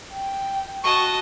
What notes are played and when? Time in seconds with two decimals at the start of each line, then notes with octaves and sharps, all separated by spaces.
0.13 G5
0.84 F#4 D#5 A5 C#6